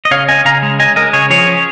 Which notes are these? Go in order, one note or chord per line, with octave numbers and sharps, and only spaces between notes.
D#5
C#3 C#5 F5
C#4 D#5 G#5
C#3 F5 A#5
G#3
C#4 D#5 G#5
G#3 A#4 D#5
C#3 G#4 C#5
F3 G#4 C#5
C#4